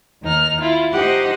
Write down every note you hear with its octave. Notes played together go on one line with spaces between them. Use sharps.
D#2 D#4 F6
E4 F4
D#4 G4 C5 F#5 D#6